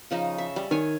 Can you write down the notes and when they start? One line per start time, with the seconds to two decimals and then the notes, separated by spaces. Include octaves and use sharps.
0.11 C#3 F3 D#4
0.38 E5
0.56 G3
0.71 D#3 C#5 G#5